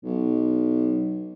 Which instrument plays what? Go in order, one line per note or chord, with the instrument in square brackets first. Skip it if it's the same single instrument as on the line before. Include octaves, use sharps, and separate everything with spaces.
[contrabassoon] B1